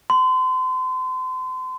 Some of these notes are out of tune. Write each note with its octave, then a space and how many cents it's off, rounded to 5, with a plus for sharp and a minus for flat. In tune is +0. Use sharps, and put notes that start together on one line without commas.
C6 -35